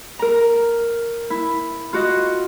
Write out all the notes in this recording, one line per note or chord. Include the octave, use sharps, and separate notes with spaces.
A#4 A#5
E4
F4 F#4 D#5